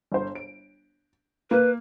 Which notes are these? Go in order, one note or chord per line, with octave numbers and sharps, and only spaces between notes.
G1 C5
D7
A#3 B4